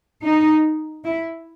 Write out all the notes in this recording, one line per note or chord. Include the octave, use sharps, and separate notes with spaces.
D#4
E4